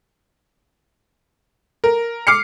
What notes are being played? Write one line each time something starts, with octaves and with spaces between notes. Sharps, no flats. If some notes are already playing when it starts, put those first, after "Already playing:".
A#4
D6 F6 C7 C#7